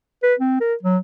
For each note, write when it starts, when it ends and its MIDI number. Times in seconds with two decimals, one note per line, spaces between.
0.23 0.35 71
0.40 0.58 60
0.61 0.74 70
0.83 0.98 54